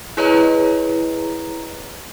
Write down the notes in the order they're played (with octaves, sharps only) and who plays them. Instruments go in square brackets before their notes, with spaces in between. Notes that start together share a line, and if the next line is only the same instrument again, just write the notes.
[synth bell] E4 G#4 B4 C#5 D#5 A#5